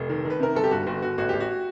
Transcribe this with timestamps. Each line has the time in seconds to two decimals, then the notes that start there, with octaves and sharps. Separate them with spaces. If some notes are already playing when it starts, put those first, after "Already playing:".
Already playing: F1 A4
0.09 D#3
0.25 D#3
0.30 B4
0.40 C3 A#4
0.55 G1 A4
0.64 G4
0.71 G2 F#4
0.86 G1 F#4
1.02 G1 F#4
1.18 A1 F#4
1.29 A1 G4
1.40 F#4